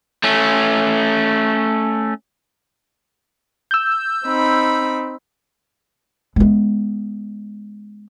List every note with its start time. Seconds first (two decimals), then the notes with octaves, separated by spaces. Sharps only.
0.24 A3 C#4
3.71 E6 G6
4.26 C4 D#4 B5
6.36 G#3 B3